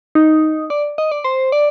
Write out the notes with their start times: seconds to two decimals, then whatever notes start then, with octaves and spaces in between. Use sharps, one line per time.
0.15 D#4
0.70 D5
0.98 D#5
1.12 D5
1.24 C5
1.52 D5